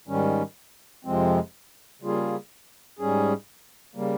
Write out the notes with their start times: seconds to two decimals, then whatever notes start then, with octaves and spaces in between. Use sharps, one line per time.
0.08 G#2 D#3 G3 C#4
1.05 F2 C3 F3 G#3 C4
2.02 C#3 G3 A#3 F4 G#4
2.99 G#2 G3 C#4 G#4
3.95 C#3 G3 A#3